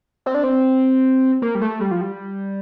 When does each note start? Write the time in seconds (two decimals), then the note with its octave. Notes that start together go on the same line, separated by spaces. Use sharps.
0.26 C4
0.35 D4
0.44 C4
1.42 A#3
1.55 G3
1.61 A3
1.80 G3
1.91 F3
2.01 G3